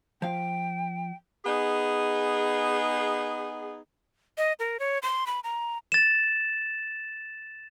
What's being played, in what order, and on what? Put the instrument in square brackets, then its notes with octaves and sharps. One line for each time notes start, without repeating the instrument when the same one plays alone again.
[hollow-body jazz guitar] F3 F5 [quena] G5
[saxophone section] B3 D#4 G#4
[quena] D#5
A#4
C#5
C6
B5
A#5
[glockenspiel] A6 E7